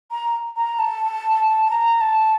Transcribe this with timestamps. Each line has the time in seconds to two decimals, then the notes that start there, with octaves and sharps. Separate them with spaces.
0.11 A#5
0.56 A#5
0.79 A5
1.71 A#5
2.01 A5